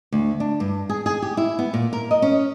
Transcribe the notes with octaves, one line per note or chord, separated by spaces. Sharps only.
D2
D4
G2
G#4
G#4
G4
E4
B3
A#2
A#4
D#5
C#4